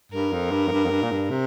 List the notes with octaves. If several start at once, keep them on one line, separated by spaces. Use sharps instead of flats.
G2 A#4
F2
G2
F2
G2
F2
G2
A#2
G2
C3